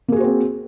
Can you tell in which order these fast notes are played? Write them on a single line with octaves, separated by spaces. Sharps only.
A#3 G#4 F#4 C5 C4